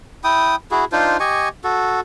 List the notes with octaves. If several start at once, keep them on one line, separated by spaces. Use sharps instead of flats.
E4 G5 D#6
E4 F#4 G#4
D4 D#4 F4 C5
G4 D#5 G#5 C#6
F#4 A4